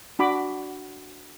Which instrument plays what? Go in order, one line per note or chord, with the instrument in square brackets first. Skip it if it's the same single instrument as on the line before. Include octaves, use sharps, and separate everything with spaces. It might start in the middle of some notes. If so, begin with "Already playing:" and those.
[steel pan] D4 F#4 B5 D6